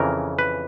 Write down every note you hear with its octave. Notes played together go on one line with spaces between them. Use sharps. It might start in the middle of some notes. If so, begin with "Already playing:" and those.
Already playing: F2 C#3 E3 A#4
B4